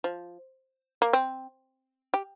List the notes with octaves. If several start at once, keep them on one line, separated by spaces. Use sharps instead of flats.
F3
A#3
C4
G4